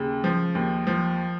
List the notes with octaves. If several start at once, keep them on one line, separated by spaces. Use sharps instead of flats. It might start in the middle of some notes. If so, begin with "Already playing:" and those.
Already playing: D#2 C#3
F3
D#2
F3